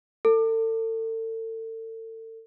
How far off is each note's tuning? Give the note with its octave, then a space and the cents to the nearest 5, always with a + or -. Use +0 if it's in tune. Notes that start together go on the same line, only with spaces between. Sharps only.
A4 +35